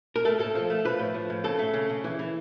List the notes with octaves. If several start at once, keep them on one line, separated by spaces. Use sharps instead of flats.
A#4
A3 A4
A2 A4
F3
A3
F3 B4
A2
F3
A2
C#3 A4
A3
C#3
C#3
E3
E3